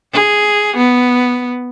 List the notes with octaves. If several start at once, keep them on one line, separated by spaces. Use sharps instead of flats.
G#4
B3